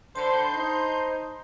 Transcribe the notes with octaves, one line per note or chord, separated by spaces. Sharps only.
D3 C5 A5 B5 C6 G6
D#4 C5